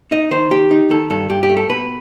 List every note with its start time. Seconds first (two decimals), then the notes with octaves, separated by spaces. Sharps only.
0.11 D#4 D#5
0.31 D#3 C5
0.51 D#3 G4
0.71 D#4
0.90 D#3 A4
1.10 G2 A4
1.29 G2 G4
1.43 G4
1.49 A3
1.57 A4
1.69 B2 B4